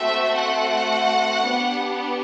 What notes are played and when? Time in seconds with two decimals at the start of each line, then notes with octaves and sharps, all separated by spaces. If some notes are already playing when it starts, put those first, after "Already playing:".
Already playing: A3 C4 F#4 E5
0.38 F#5
1.45 B3 D4 G4